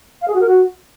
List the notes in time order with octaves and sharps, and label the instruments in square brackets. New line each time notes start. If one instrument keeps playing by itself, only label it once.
[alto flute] F5
G#4
F#4
A#4
F#4